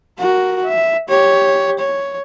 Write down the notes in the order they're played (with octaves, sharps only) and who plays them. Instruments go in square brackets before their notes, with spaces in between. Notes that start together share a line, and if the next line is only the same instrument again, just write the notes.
[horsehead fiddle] F#4 A#4
E5
G4 C#5
C#5